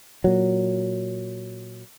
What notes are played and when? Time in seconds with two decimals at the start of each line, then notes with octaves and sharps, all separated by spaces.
0.24 A#2 F#3